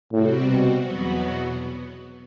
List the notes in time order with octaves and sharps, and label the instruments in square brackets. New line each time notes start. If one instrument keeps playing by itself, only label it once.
[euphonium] A2 [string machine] C3 G3 C4 F#4
[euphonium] B2
[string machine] E2 B2 F#3 B3 F#4